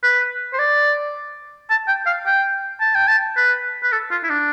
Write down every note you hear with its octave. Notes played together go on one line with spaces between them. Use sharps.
B4
C5
D5
A5
G5
F5
G5
A5
G5
A5
B4
B4
A4
F4
E4
D4